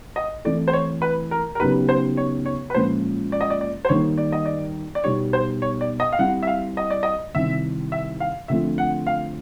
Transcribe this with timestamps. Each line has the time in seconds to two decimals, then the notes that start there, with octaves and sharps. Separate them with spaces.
0.16 D#5
0.45 E3 A3 C4 E4 A4 D5
0.68 C5
0.73 C#5
1.02 B4
1.31 A#4
1.55 A#4
1.60 C#3 F#3 B3 D#4 G4 B4
1.89 C5
2.17 C#5
2.46 C#5
2.70 B4
2.74 A#2 F3 G#3 C#4 F4 C5
3.32 D5
3.41 D#5
3.50 D5
3.61 D5
3.85 C5
3.89 D#3 G3 A#3 D#4 C#5
4.18 D5
4.32 D#5
4.45 D5
4.95 D5
5.04 B2 G3 B3 D#4 G4 C#5
5.33 C5
5.62 C#5
5.81 D5
6.00 D#5
6.12 F5
6.19 G3 C4 E4 F#5
6.43 E5
6.47 F5
6.77 D#5
6.90 D5
7.03 D#5
7.34 C3 D#3 G3 C4 E4 E5
7.92 E5
8.20 F5
8.48 D3 F3 A3 C4 F4 E5
8.78 F#5
9.07 F5